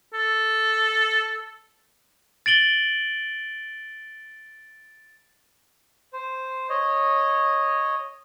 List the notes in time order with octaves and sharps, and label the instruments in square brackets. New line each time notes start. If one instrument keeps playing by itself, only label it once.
[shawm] A4
[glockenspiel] A6 D7 F#7 G7
[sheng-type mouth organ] C5
C#5 D#5